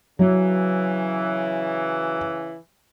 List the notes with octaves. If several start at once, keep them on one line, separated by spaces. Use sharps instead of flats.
C#3 E3 F#3